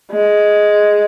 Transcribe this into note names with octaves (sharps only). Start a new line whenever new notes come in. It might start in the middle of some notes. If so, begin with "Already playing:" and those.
G#3